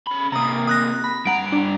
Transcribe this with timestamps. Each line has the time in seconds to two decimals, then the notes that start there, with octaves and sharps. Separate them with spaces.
0.07 C#4 B5
0.32 C3 A#3 A#5 D#6
0.67 D#6 F#6 A#6
1.04 B5
1.25 G2 F#5 A#5 D7
1.52 D4